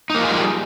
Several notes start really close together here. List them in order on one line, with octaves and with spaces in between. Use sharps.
D#4 A#3 F3 G#4 G3